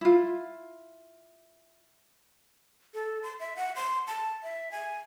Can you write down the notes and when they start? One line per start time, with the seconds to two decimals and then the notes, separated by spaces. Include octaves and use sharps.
0.01 E4 F4
2.94 A4
3.23 C6
3.40 E5
3.56 F#5
3.76 C6
4.07 A5
4.43 E5
4.72 G#5